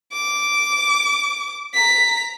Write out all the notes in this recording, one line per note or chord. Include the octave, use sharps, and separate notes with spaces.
D6
A#5 B6